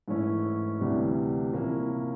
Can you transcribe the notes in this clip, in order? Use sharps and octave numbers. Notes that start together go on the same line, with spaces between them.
G#2 E3 A3 C#4 E4
D2 C3 E3 G3
C3 F3 A#3 C#4 E4